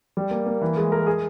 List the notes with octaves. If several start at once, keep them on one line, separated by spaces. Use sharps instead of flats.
G3
A#3
A#3
E3
G#3
A#4
G#4